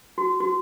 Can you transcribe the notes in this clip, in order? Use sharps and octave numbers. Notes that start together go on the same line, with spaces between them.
F#4
F#4